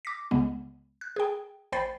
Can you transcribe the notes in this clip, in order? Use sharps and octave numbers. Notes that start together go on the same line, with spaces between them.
D6 A#6 B6
C#2 C#3 G#3 B3
F#6
G#4 G5
A1 C5 G5 B5 A6 C7